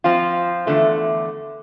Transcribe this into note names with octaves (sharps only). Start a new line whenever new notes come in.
F3 C4 F4
E2 D3 A3